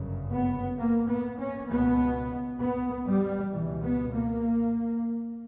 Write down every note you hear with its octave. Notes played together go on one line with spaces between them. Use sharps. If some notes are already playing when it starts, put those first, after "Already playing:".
Already playing: G1 F#2 C#3
B3
A#3
B3
C#4
C#2 B2 B3
B3
G3
C#2 B2 E3
B3
A#3